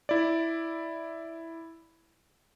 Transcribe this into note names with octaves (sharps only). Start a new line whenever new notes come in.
E4 D5